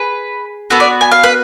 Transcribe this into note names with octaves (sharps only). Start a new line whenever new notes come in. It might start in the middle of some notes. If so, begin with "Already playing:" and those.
Already playing: G#4 B4
B3 F#4 A4
D5
G#5
F5
B4